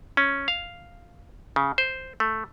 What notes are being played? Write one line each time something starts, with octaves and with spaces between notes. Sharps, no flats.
C#4
F5
C#3
C5
A3